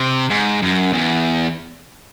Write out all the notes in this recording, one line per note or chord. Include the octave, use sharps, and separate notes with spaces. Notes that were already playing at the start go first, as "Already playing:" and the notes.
Already playing: C3
G#2
F#2
E2